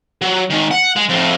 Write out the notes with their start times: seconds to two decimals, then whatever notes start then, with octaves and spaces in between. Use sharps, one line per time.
0.21 F#3
0.50 D#3 G#3
0.71 F#5
0.97 G#3
1.10 F2 A2